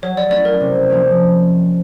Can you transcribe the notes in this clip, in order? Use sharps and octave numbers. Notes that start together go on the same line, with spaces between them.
F#3 C#5
D5
A3 C#4 E4 D5
A#4
C3
F3 A#3 C#4